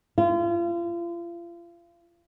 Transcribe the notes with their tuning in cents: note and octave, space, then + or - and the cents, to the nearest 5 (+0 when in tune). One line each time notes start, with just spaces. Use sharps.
F4 -35